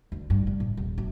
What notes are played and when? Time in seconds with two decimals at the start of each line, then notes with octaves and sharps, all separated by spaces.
0.12 D2
0.30 G2
0.47 G3
0.60 A2
0.77 D#1
0.98 F#2